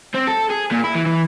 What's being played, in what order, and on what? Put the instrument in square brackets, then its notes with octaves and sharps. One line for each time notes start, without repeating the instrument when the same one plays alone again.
[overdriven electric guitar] C4
A4
G#4
A#2
E4
E3
E3